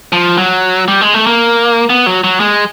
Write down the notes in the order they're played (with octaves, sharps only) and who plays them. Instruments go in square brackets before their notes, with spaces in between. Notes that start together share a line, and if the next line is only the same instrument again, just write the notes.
[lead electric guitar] F3
F#3
G3
G#3
A3
A#3
B3
F#3
F#3
G#3